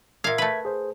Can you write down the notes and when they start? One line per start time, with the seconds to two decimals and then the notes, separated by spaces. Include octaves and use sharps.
0.24 A#2 E5 F5 G#6
0.38 A3 B4
0.65 G#4 C5